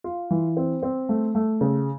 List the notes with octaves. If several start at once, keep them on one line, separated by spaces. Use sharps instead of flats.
F4
E3
C4
C4
A3
A3
C#3